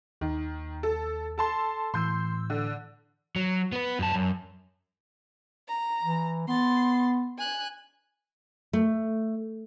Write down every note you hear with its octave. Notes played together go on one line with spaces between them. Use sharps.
D#2 D#3
A4
A4 A5 C6
A2 E3 C6 E6 G6
D3
F#3
B3 B4
F#2 A5
F#2
A#5
E3
B3 C6 A6
G#5 F#6
A3